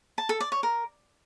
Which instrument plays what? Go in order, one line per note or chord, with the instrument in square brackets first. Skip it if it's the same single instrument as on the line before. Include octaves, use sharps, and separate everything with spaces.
[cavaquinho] A5
A4
D5
C#5
A#4